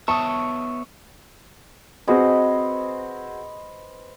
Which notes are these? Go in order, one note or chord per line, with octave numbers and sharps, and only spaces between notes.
B3 C#5 E5 A5 C#6 D#6
C4 F#4 G#4 B4 C5 D#5